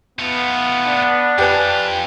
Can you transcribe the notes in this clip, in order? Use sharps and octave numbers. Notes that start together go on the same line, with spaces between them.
A3 B3 F4
D4
F2 F4 G4 B4 G#5